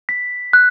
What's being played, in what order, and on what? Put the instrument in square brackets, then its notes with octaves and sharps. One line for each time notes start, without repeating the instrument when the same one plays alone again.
[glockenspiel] B6
F#6